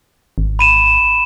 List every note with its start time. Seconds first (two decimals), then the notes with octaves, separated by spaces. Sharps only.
0.38 G#1
0.59 B5 D#7 E7